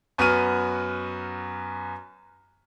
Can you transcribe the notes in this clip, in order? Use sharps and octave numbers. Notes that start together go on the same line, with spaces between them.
F#2 B3 F#4 C#6 F6 D#7